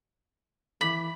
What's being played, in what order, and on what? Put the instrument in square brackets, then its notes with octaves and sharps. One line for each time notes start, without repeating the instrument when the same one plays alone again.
[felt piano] E3 D6 B6 [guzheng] B5